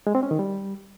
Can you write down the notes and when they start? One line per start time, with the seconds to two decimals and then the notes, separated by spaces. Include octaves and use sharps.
0.07 G#3
0.15 C4
0.23 C#4
0.31 D#3
0.39 G3